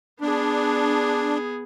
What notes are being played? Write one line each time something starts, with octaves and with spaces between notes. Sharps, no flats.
B3 D4 G#4